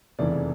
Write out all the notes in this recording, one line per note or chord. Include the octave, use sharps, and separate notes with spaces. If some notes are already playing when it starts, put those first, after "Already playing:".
F1 E2 C#3 E3 D5